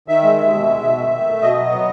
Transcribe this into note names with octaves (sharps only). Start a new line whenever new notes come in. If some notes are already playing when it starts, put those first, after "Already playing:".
D#3 E5
G#3
D#2
B2
G#3
B2
D#3
D#3
A3
B2 D#5
F#3
B3